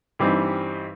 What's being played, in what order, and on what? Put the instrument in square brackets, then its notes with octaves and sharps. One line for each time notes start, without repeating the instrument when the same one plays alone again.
[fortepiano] G2 E3 G3 C4 D#4